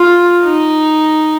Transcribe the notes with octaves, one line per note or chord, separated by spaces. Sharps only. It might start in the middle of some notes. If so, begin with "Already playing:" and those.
Already playing: F4
D#4